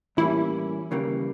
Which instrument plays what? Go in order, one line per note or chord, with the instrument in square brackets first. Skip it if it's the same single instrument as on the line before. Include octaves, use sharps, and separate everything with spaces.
[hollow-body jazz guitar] A2 E3 G3 A#3 C#4 [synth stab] E4
[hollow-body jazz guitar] D#2 C#3 E3 G3 A#3